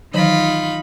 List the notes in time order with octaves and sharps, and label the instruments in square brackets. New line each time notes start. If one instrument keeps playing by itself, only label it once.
[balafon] D#3 E3 F#3 [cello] D#4 [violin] F4 B5